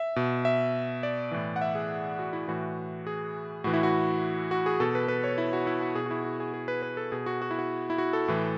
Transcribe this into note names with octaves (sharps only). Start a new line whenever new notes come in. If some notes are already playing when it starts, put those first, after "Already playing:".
Already playing: E5
B2
E5
D5
A2 E3
F#5
E5
G#4
F#4
E4
A2 E3 F#4
G#4
A2 E3 F#4
E4
F#4
F#4
G#4
B2 A4
B4
B4
C#5
E4
F#4
E4
F#4
B2 G#4
F#4
E4
F#4
G#4
G#4
B4
B4
A4
B2 G#4
F#4
F#4
E4
F#4
E4
F#4
A4
A2 E3